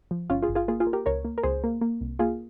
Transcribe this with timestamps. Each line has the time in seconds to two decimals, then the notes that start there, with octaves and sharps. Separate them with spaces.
0.11 F3
0.30 G1 C#4 F4
0.43 F4 G#4
0.49 G1
0.55 F4 G#4
0.68 A#3 F4 G#4
0.80 F4 G#4
0.87 A#3
0.93 G4 A#4
1.06 C#2 A#4 C#5
1.25 A#3
1.38 A#4
1.43 C#2 G#4 C5
1.64 A#3
1.81 A#3
2.01 C2
2.19 A#3 F4 G#4